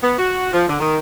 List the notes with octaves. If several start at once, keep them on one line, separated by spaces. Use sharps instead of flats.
B3
F#4
F3
D3
D#3